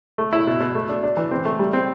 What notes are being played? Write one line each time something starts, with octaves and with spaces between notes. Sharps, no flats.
A3
E4
B2
B2
A3
D4
D4
E3
C4
A3
G3
C4